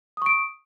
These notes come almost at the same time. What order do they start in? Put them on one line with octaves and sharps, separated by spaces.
D#6 C#6 D7